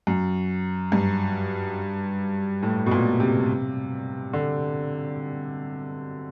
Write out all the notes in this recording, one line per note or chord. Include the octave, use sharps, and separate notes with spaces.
F#2
G2
A2
B2
A#2
C3
D3